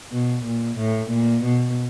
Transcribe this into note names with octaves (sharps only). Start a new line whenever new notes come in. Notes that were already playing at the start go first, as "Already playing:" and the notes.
B2
A#2
A2
A#2
B2